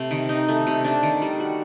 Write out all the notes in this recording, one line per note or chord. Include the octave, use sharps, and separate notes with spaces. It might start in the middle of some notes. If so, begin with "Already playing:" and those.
Already playing: C3 A3
D#3
D#4
A3
C3
D4
D#3
G3
F#4